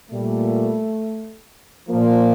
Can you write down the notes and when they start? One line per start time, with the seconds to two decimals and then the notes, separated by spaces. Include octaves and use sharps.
0.10 A#2 G3 A3
1.89 A#2 F3 A#3